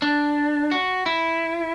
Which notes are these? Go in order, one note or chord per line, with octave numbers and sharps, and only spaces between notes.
D4
F#4
E4